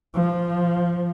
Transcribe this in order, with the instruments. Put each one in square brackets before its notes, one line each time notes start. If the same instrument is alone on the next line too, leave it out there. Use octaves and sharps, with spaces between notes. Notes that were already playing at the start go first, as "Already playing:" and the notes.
[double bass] F3